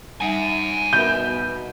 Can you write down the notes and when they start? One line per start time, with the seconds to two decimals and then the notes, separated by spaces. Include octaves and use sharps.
0.21 G3 D#4 E5 F#5 G#5
0.93 B2 A#4 E5 B5 G6